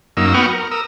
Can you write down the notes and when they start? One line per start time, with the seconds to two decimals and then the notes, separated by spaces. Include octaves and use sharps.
0.17 F#2 A#3 D#4 E6
0.34 B3 F#4 G5 C#6 D#6 F6
0.53 A#4
0.71 A#4 D#6 E6